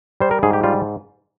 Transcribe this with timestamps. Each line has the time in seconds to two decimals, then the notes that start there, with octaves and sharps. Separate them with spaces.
0.20 G3 C5
0.31 A#4
0.43 G#2 G#4
0.53 G4
0.63 G3 F4